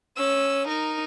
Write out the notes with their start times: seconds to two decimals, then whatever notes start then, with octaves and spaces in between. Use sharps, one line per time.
0.17 C#4 E6
0.68 D#4 A#4